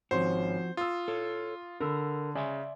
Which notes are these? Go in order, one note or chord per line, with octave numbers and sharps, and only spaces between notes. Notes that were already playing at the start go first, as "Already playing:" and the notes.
G#1 F3 C#4 F#4 C5 C6
F4 D#6 E6
A4 C#5
D3 A#4 B5 E6
C#3 D5 E5 G#5 C6